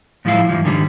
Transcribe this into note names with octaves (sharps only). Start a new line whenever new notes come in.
A2 F3 G#3 E4 F5
G2 E3 F3
G#2 D3 D#3 G3